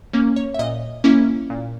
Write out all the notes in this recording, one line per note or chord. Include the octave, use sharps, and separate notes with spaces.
A#3 C#4
C#5
E5
A#2 D#5
A#3 C#4 E4
A#2